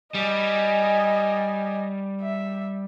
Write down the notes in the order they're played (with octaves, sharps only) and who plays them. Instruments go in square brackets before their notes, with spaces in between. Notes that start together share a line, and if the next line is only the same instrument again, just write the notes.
[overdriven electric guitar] G3 [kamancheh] D#5 G#5
[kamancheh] E5